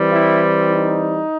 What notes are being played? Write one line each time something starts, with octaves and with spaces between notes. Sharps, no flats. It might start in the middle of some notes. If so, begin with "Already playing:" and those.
Already playing: E3 G3 C4
E4
D#4